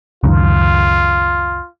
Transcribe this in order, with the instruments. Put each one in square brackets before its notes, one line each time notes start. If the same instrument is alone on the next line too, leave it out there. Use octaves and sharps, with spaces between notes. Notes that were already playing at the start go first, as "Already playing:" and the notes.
[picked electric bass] C#2 F#2 D#3 [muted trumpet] F4